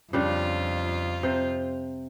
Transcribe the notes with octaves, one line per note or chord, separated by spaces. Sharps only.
F2 C#3 G3 D4 F4
C3 C5